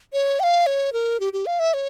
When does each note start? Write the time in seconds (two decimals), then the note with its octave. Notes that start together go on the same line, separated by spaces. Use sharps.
0.13 C#5
0.40 G5
0.43 F5
0.66 C#5
0.93 A#4
1.20 G4
1.33 G4
1.46 F5
1.59 E5
1.74 C#5